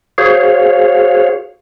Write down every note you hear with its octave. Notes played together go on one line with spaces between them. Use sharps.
F#4 G#4 C5 C#5 F5